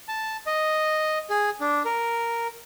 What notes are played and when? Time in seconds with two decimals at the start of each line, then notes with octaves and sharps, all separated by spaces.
0.08 A5
0.47 D#5
1.30 G#4
1.61 D4
1.85 A#4